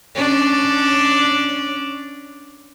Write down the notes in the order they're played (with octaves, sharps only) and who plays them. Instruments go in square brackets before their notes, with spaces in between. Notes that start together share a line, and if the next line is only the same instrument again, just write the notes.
[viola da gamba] C#4 D4